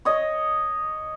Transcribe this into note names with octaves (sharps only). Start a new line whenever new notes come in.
C#5 D#5